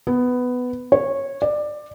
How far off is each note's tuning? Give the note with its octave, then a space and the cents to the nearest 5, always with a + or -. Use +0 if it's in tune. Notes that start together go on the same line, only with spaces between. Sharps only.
B3 +10
C#5 -15
D5 +20